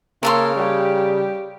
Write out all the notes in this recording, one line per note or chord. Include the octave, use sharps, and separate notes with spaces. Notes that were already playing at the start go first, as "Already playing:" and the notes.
C#3 A#3 A4 A#4 C#5 C6
G3 G4